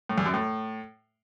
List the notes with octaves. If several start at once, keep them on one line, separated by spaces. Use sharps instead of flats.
A2
E2
F#2
A2